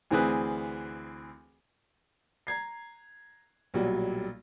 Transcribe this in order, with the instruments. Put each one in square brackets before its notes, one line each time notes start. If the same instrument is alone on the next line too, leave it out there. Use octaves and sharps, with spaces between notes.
[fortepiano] D2 E3 C4 G#4 B4
[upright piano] A#5 G#6 C7
B1 A#2 F#3 G3